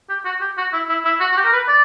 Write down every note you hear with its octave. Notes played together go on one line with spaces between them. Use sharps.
G4
F#4
G4
F#4
E4
E4
E4
F#4
F#4
G4
A#4
B4
D5